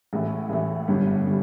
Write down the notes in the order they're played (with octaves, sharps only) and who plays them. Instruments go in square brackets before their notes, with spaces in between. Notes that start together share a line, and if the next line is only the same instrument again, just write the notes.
[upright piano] A1 A2 E3 A3
A1 A2 E3 A3
G1 F#2 D3 G3
D3 G3